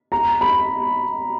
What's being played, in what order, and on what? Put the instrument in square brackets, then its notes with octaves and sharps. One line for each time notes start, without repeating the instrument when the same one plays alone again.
[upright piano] A#5
B5